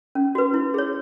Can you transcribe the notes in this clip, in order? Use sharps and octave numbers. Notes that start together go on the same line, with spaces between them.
C#4
F#4 B4
E4
G#4 C#5